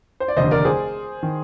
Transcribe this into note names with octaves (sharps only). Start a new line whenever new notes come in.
C5
D5
F1 D#2 D3 C5 D#5
A#4 D5
G#4 C5
D#3